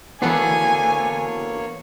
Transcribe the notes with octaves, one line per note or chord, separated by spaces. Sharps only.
E3 A#3 B3 D4 F#4 A4 C#5 G#5